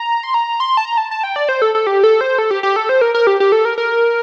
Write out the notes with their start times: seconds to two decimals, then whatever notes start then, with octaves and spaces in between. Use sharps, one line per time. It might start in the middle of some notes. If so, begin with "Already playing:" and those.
Already playing: A#5
0.23 C6
0.34 A#5
0.60 C6
0.77 A5
0.85 A#5
0.98 A5
1.11 A5
1.23 G5
1.36 D5
1.49 C5
1.62 A4
1.75 A4
1.87 G4
2.04 A4
2.21 C5
2.38 A4
2.51 G4
2.63 G4
2.76 A4
2.89 C5
3.01 A#4
3.14 A#4
3.27 G4
3.40 G4
3.52 A4
3.65 A#4
3.78 A#4